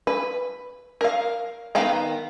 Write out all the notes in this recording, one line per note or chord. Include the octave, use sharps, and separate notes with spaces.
B4
A#4 F5
D#3 B3 F5 G5 A#5